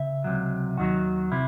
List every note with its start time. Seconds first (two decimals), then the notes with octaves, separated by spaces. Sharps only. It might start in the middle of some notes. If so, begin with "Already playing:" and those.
Already playing: C#3 E5
0.24 C#2 C3 F#3
0.78 D#2 D#3 F#3 F#4
1.32 C3 E4